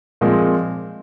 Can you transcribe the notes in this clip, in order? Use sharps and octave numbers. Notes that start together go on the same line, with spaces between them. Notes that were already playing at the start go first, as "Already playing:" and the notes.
A#2 F3 G#3 C4 F4